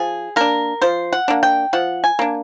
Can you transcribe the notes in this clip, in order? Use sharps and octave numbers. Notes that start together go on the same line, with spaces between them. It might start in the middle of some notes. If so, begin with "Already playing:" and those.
Already playing: F3 G#4
A#3 D4 A#4
F3 C5
F#5
A#3 D4
G5
F3 F#5
G#5
A#3 D4